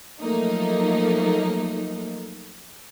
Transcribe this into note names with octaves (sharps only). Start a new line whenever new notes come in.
F3 F#3 A3 A#3 D#4